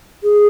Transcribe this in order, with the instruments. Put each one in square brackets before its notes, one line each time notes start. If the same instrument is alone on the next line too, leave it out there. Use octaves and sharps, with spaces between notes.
[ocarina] G#4